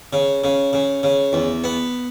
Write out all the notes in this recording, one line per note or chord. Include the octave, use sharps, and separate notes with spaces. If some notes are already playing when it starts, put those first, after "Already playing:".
C#3
C#3
C#3
C#3
E2
B3